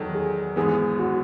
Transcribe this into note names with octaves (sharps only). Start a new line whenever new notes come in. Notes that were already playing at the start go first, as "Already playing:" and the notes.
Already playing: E2 D#3 F#3 A4
G#4
G#1 G#2 E3 B3 G#4
F#4